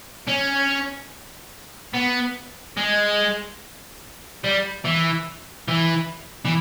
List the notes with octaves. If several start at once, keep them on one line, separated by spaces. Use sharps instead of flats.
C#4
B3
G#3
G3
E3
E3
E3